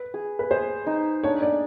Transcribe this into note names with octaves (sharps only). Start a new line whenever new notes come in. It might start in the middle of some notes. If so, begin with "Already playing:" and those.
Already playing: B4
G#4
B4
G#4 C5
D#4
D4 C#5
D5